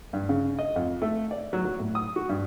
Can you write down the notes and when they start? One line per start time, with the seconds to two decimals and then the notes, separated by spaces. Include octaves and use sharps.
0.13 G2
0.29 C#3
0.59 D#5
0.76 F2
1.02 A3
1.31 D5
1.53 F#3
1.65 F#3
1.79 A2
1.95 D#6
2.16 F#4
2.29 G2